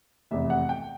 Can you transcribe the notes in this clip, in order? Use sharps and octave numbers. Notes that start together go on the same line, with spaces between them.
F1 E2 C3 E5
F#5
G5